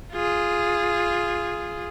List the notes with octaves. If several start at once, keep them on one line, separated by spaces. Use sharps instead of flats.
F4 G#4